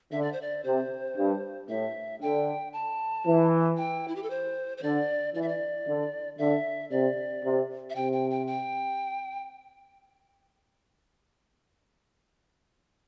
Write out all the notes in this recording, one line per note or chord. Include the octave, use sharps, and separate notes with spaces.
D3 E5
D5
C5
D5
C3 C5
G2
A2 E5
D3 G5
A5
E3
G5
E4
G4
A4
C5
C5
D3 D5
E3 D5
E5
D5
D3
D3 E5
C3 D5
C3
E5
C3 G5
G5
G5
G5